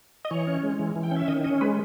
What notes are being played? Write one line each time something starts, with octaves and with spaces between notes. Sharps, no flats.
D#5
E3 C#5
C#4
G#3
E3
E3
G5
C#4
E5
D#3 D#5
C#4 D#5
G#3 B4